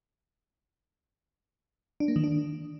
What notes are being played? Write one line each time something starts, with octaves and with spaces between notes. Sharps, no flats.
D4
A#3
D#3
D4